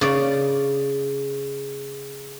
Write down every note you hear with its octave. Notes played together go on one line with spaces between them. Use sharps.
C#3 D5